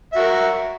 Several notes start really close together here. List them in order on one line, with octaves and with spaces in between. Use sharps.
E5 F#4 A#4